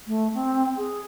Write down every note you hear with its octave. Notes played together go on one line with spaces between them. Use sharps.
A3
C4
G#4